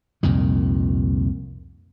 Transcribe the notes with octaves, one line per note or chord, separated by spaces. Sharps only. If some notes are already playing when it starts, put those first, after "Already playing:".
C2 F2 A#2 D#3